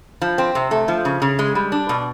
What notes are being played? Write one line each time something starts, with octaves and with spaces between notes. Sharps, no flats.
F3
C4
C3
A3
F3
C#3
C#3
G#3
G3
D4
B2